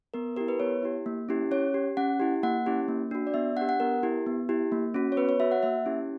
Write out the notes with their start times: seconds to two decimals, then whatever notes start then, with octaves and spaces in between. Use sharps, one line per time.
0.14 B3 A#4
0.36 E4 G4 A#4
0.48 B4
0.60 B3 C#5
0.83 E4 G4
1.06 A#3
1.29 C#4 E4 G4
1.51 C#4 C#5
1.74 G4
1.97 C#4 F#5
2.20 E4 G4
2.43 A#3 F#5
2.66 C#4 E4 G4
2.88 A#3
3.11 D4 F#4
3.27 D5
3.34 B3 E5
3.57 D4 G4 F#5
3.69 F#5
3.80 B3 A#4
4.03 E4 G4
4.26 B3
4.49 E4 G4
4.72 A#3
4.94 C#4 F#4
5.12 C#5
5.17 B3 B4
5.29 C#5
5.40 F#4 E5
5.52 F#5
5.63 A#3 E5
5.86 C#4 E4 G4